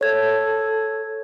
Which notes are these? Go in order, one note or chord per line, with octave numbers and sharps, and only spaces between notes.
A4 C#5 G#6